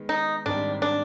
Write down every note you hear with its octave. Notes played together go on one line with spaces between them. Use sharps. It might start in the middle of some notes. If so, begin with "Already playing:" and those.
Already playing: D#3 G#3 B3
D#4
G#2 D#3 G3 C4 D4 G4
D4